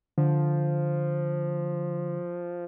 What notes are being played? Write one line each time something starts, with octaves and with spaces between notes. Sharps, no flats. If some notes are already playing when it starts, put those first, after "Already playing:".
D3 F3